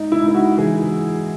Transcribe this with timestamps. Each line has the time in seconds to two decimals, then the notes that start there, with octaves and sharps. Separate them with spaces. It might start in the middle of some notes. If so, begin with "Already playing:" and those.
Already playing: G#2 D#4
0.12 E4
0.23 G#2
0.28 E4
0.34 F#4
0.58 E3 G#4